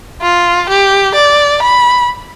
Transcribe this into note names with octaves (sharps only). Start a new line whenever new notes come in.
F4
G4
D5
B5